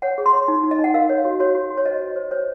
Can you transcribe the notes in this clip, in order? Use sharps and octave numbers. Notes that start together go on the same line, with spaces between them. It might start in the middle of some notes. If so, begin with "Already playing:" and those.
C#5 F#5
G#4
C6
C#5
D#4
D#4
D#5
D#4
F#5
A#4 F5
C#5
F#4
F#4 C#5
F#4
F#4
C#5
C5 D#5
F#4
C5
C5 C#5